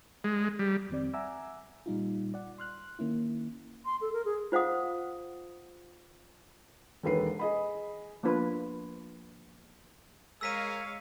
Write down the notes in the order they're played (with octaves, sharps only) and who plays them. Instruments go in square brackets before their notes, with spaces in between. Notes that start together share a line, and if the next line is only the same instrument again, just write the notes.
[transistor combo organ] G#3
G3
[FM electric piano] F2 D#3 C4 D5
E5 F#5 G#5 A#5 D6 E6
A#2 G3 D#4 F4
D5 F#5
C6 F6 F#6
D#3 A#3 C#4 E4
[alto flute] C6
A4
A#4
G#4
[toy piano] F4 C5 F5 F#5 D#6
[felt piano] E1 D#2 A4 B4 C7
G#4 D#5 B5
[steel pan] F3 A#3 B3 D4 F4 B4
[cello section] G#3 C#5 F5 [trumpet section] G#4 A#4 [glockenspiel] E6 B6 D#7